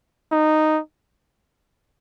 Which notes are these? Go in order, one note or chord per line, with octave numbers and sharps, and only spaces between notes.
D#4